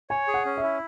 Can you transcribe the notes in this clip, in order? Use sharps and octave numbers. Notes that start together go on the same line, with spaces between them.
C#5 G#5
G#4
F#5
C#4
E5
E4